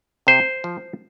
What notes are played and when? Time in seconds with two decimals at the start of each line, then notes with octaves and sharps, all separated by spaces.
0.27 C3 C5
0.64 F3